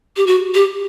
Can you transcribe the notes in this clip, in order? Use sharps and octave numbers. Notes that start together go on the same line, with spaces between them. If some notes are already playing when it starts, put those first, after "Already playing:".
G4
F#4
G4